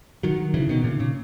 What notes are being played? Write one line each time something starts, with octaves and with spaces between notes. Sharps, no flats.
D#3 F#3
C#3 E3
B2 D#3
A#2 C#3
A#2 C#3